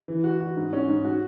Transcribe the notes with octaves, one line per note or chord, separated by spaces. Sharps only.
E3
F#4
F#4
G#2
C#4
G#2
F#4